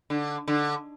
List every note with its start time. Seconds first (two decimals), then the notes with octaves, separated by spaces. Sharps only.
0.10 D3
0.48 D3